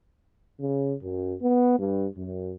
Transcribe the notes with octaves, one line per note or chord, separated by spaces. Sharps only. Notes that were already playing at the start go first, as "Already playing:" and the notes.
C#3
F#2
B3
G2
F#2